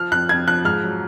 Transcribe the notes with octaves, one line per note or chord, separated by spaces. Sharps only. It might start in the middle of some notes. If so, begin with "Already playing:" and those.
Already playing: F3 F6
F2 F#6
F2 G#6
F3 F#6
G#2 F6
F#3